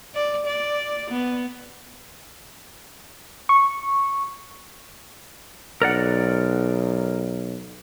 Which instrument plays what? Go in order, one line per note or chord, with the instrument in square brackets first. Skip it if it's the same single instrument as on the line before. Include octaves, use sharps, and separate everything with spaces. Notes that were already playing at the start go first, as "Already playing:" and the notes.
[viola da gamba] D5
D5
B3
[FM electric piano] C#6
[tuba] B1 [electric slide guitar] A#4 D5 F#5